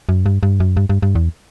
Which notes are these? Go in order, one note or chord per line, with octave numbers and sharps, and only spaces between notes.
F#2
G2
G2
F#2
G2
G2
G2
E2